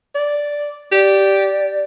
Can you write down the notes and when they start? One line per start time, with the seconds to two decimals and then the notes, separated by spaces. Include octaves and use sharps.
0.15 D5
0.92 G4 D5